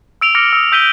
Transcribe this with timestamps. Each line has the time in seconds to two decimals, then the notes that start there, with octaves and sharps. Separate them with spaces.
0.21 E6 D7 F7 G7
0.35 D6 F6 A#6 C#7 D7
0.53 D#6 E6
0.72 E6 G6 B6 D#7 F7 G7